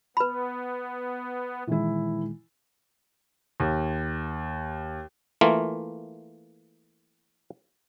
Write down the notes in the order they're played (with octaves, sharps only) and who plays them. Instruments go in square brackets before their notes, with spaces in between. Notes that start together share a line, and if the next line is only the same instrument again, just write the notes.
[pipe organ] B3 [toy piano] B4 B5
[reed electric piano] A#2 D#3 G#3 [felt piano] E3 E4
[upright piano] D#2
[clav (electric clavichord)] E3 A3 A#3 F4